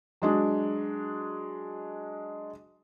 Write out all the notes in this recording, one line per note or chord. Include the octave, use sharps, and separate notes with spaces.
F#3 G#3 D4